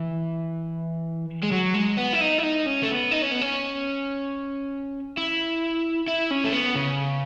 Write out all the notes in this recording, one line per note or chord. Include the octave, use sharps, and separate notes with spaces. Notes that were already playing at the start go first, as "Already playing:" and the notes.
Already playing: E3
G#3
F#3
G#3
B3
E4
D#4
E4
D#4
C#4
A3
B3
D#4
C#4
B3
C#4
E4
E4
C#4
A3
B3
C#3